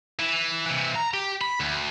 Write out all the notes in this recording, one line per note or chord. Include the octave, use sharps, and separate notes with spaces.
E3
C3 E3
A#5
G4
B5
D2